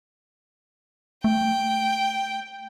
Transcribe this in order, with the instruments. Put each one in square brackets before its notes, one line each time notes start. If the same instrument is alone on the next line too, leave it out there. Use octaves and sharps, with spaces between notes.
[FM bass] A3 [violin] G5